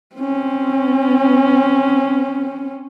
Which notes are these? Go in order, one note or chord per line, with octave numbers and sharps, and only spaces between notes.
C4 C#4